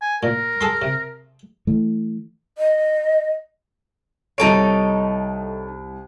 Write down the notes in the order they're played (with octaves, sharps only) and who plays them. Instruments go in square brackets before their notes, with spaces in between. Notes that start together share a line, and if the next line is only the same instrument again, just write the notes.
[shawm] G#5
[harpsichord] A#2 [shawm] A#4
[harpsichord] G#4 A4 C6
C3
[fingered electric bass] E3 A3
[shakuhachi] D#5
[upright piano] C2 D7 [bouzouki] D#4 A4 C#5